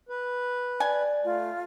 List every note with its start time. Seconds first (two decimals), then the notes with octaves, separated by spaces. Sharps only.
0.09 B4
0.80 D5 G#5
1.24 A3 F4